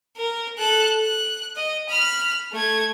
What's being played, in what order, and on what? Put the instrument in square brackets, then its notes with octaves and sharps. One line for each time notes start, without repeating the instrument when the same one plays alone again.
[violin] A#4
A4 F#6
F#6
D#5
B5 F6
A3 G#6